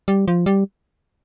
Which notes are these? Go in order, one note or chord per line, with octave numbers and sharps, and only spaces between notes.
G3
F3
G3